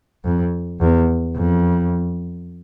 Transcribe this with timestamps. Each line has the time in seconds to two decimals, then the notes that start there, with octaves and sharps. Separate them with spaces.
0.25 F2
0.80 E2
1.36 F2